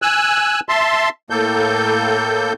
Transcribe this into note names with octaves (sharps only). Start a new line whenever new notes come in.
G#5 E6 F#6
E5 A5 C6
A2 A#3 A4 G6